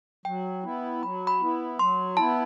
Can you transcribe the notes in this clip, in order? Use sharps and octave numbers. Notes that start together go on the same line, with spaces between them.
F#3 G5
B3 E4
F#3 B5
B5
B3 E4
F#3 C6
B3 E4 A5